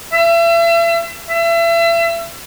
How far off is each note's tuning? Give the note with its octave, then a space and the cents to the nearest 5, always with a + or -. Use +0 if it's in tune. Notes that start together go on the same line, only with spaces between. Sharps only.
E5 +35
E5 +35